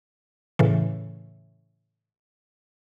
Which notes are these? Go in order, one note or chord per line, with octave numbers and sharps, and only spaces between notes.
A2 C#3 E3